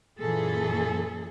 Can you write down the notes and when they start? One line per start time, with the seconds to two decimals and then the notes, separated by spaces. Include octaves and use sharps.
0.20 F#2 A#2 E3 G#4 A4